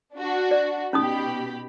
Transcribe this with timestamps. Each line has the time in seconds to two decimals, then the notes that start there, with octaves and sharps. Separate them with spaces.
0.15 D4 F#4
0.51 D5
0.93 B2 C#4 D#4 G4 B5 D#6